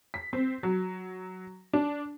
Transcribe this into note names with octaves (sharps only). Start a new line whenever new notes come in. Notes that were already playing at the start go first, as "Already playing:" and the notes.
B6
C4
F#3
D4